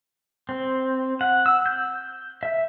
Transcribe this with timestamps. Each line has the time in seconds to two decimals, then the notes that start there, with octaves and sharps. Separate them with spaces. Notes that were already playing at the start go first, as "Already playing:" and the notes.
0.49 C4
1.21 F#5
1.46 E6
1.66 G6
2.43 E5